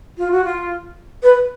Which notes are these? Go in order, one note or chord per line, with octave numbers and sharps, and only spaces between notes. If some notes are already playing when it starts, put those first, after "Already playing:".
F4
F#4
F4
B4